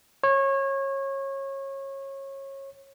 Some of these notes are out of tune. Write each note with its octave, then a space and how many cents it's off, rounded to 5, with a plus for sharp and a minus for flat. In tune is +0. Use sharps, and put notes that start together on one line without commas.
C#5 -25